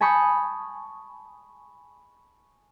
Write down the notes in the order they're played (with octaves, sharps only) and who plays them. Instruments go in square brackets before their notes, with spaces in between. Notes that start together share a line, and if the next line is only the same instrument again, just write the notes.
[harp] G#5 A5 B5 C#6 D#6 G6